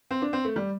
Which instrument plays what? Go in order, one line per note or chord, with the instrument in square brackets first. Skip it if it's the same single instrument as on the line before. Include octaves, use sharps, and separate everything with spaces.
[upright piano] C4
D4
C4
A3
G3